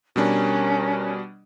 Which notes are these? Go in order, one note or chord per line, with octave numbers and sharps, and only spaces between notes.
B2 G3 C#4 D4 A#4